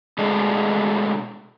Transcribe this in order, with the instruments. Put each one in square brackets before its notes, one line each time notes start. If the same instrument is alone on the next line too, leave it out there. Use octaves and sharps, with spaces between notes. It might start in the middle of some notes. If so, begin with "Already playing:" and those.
[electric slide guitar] B2 G#3 A3 D4 G#4